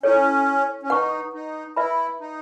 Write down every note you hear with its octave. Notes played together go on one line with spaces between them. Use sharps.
C#4 E4 A4 C#5
C#4
D#4 B4 F#5 C#6
D#4
E4 B4 E5 B5
D#4